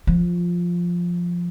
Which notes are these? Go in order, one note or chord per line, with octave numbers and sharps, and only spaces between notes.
F3